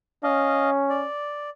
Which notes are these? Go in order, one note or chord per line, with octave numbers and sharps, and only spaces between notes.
C#4 D#5 F5
D5